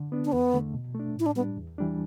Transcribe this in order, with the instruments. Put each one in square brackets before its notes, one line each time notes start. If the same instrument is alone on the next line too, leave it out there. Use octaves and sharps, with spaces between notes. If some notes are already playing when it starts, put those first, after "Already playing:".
Already playing: [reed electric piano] D3
B3 D4
[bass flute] D4
[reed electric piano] E2 [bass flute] B3
[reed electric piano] D3 A3
B2
A3 D4
[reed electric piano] A2 [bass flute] E4
[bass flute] D4
[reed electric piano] G3 [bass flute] B3
[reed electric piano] D4
E2
E3 G3 D4